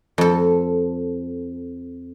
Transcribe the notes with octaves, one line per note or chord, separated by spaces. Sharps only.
F2 A4